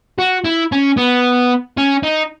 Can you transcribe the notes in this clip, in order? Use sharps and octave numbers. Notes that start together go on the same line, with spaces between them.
F#4
E4
C#4
B3
C#4
D#4